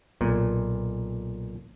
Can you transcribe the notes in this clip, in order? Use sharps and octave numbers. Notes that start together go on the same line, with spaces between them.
B1 A#2